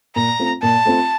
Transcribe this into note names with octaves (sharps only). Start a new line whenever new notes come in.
A#2 A#5
A3 C4 F4
A#2 A5
A3 C4 F4